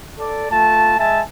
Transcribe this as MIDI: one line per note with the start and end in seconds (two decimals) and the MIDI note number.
0.18 0.48 69
0.18 0.48 74
0.50 0.96 57
0.50 0.96 65
0.50 0.96 81
0.99 1.22 56
0.99 1.22 76
0.99 1.22 80
0.99 1.22 81